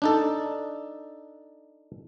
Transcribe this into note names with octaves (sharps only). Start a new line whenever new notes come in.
D4 D#4 A4